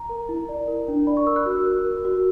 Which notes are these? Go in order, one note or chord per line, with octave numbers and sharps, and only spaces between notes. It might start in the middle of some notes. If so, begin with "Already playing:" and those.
Already playing: A#5
A#4
E4
D5
A#4
D4
D5 B5
C#6
A#4 E6
F#6
F#4 E6
A#4
A#4
F#4